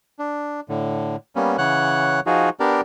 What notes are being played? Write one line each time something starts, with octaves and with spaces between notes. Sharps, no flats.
D4
A2 D3
G3 A#3 B3 C#4
C#3 E3 C#5 F#5 F#6
F3 D#4 F4 F#4 G#4
B3 D4 G4 A#4 D5